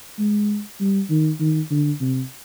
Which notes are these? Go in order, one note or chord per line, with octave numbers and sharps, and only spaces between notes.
G#3
G3
D#3
D#3
D3
C3